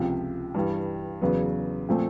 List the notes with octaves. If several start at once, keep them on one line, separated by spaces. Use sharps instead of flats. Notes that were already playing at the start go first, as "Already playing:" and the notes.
Already playing: C#2 C3 F3
G2 E3 G3
E2 C#3 F#3 B3
A#2 F3 A3 C4